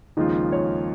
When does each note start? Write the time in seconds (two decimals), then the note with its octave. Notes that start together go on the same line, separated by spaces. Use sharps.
0.17 D#2 C#3 F3 G#3 D#4 F4
0.52 C#5